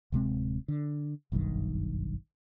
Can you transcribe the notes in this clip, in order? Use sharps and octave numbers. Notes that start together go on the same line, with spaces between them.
D1 C3 G#3 C4
D3
F#1 B1 G2 D#3